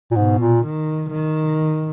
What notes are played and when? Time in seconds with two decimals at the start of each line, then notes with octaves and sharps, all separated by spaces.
0.12 A#2
0.16 G#2 B2
0.39 A#2
0.64 D#3
1.11 D#3